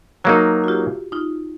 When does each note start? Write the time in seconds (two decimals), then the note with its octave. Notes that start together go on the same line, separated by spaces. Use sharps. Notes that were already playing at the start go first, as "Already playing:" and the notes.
0.24 F#3 A#3 D#4 F#4 G#4
0.64 F#4
0.68 F4 G4
1.12 D#4 F4